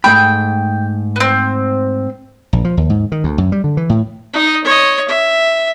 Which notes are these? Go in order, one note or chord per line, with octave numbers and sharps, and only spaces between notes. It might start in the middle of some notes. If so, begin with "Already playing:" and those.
G#2 A3 G5 B5
B3 C4
A#1
F3
D#2
G#2
D#3
D2
F#2
G3
D3
E3
A2
D#4 D#5
C#5 D#5
E5